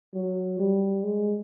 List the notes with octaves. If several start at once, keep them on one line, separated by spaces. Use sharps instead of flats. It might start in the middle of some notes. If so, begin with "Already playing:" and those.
F#3
G3
G#3